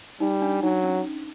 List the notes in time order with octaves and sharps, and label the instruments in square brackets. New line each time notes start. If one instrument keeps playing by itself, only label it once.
[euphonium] G3 [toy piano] D#4
[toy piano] D4
[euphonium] F#3 [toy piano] D#4
[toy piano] C#4